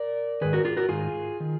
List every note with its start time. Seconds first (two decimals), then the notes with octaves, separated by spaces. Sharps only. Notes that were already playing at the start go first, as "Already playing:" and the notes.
Already playing: A#4 D5
0.41 G#2 D#3 G#4 B4
0.53 F#4 A#4
0.65 F4 G#4
0.77 F#4 A#4
0.89 G#2 D#3 F4 G#4
1.40 D#3